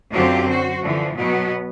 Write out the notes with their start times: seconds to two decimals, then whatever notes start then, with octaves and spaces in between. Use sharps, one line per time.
0.11 F#2 D3 F#3 C4 F4 G4
0.48 F#4 C5
0.81 D3 E3 F3
1.15 B2 F#3 B3